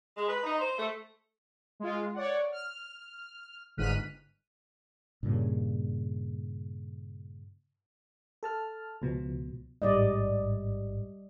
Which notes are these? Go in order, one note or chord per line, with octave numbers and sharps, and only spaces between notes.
G#3
B4
D#4
C5
A3
G#3 F4
C#5 D5 F#5
F6
G1 G#2 F6 F#6 B6 D#7
G2 A#2 C#3
A4 A5 F6
C#2 B2 F3
A1 G#2 G3 D5 D#5